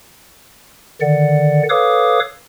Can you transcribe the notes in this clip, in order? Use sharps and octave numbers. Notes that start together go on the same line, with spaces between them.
D3 D#3 D5 F#5
A4 B4 C#5 F5 D6 D#6